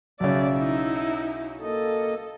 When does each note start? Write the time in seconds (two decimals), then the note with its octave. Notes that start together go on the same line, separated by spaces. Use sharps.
0.20 B1 C#3 D5 E5
0.56 D#4 E4
1.61 A#3 A4 D#5